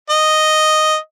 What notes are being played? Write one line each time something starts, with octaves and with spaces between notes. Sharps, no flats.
D#5